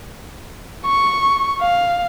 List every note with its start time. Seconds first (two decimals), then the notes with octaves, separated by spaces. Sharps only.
0.85 C#6
1.62 F5